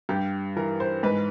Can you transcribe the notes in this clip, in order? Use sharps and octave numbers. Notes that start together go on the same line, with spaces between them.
G2 G4
E3 A#4
C5
G#2 B4